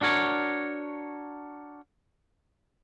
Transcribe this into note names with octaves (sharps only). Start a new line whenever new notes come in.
D4 F#4 A#4 C#5